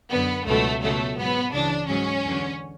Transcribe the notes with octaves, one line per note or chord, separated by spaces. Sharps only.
F#2 D3 F#3 B3
C#2 B2 F#3 A3
C#2 B2 F#3 A3
G#2 F#3 B3
C#2 C#3 E3 D4
G#2 F#3 C#4
E2 D3 F#3